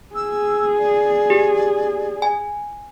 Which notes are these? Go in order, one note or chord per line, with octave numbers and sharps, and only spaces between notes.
G#4 E6
D5
G4
G#5